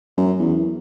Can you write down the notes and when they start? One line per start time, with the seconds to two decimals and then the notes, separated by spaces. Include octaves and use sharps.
0.17 F#2
0.39 E2